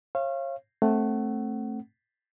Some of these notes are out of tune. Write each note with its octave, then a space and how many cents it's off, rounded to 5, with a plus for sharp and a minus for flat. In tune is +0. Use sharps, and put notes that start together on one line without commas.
C#5 -35 F5 -25
A3 +0 C4 +20 F#5 +25